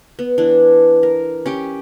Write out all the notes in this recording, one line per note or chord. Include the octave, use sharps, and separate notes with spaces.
B3
E3 D4
A#4
C#4 G4 G5